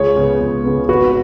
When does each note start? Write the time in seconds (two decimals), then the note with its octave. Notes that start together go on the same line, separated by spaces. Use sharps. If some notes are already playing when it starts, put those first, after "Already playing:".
Already playing: C#2 G#4 C#5
0.16 C#3 B3
0.41 C#2
0.64 C#3 B3
0.89 G#1 F#4 B4